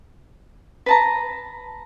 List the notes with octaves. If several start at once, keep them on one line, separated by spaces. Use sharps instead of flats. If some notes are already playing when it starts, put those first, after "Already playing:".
B4 A5 A#5